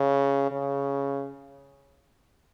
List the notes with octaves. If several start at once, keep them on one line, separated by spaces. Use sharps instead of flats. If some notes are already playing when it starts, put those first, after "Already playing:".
Already playing: C#3
C#3